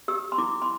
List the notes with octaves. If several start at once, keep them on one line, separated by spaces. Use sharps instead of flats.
G4 E6
C6
E4 D6
C6